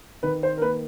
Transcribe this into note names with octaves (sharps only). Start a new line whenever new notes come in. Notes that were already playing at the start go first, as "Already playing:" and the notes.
D#3 B4
C5
A#4
A#3 B4